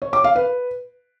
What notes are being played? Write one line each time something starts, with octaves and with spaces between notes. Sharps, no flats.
C#5
D6
F5
B4